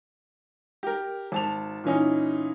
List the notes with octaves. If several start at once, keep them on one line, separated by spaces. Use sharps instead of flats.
G4 A#4
G#1 A5 F7
A#2 E3 C#4 D#4